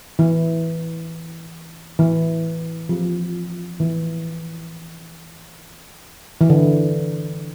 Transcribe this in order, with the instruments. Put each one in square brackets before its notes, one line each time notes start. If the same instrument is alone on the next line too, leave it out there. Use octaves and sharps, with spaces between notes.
[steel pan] E3
E3
F3
E3
E3
D3